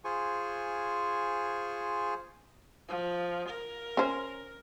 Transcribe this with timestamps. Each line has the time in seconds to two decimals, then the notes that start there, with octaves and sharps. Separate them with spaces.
0.04 F4 G#4 C5 G#5 C#6
2.89 F3
3.49 A#4
3.97 C#4 C5